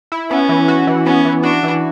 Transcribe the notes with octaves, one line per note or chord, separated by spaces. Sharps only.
E4
B3 C#4
E3
F#4
E3
B3 C#4
E3
D4 F#4
E3